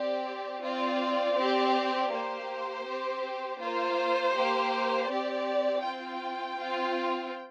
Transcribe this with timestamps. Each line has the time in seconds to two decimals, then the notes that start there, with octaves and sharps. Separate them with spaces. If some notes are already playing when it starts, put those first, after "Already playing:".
Already playing: C4 G4 D5
0.62 C4 F4 D5
1.36 C4 G4
2.11 A#3 G4 C5
2.85 C4 G4
3.59 A#3 F4 C5
4.34 A#3 G4
5.08 C4 G4 D5
5.82 C4 F4 G5
6.57 C4 F4